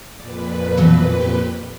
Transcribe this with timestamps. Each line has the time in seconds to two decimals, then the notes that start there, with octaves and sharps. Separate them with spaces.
0.20 F2 A#2 B4 D5
0.77 B2 E3 F#3
1.21 G4